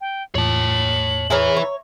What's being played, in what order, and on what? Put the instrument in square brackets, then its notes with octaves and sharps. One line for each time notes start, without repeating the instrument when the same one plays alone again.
[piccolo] G5
[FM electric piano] E2 A2 F4 [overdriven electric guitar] C#5 A5 [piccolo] F#7
[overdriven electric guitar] E4 B4 [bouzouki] G#4 A#4 C#5
[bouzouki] C#5 [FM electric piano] E5 A#5